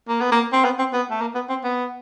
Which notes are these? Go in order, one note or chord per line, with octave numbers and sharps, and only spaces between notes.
A#3
B3
A#3
C4
B3
C4
B3
A3
A#3
B3
C4
B3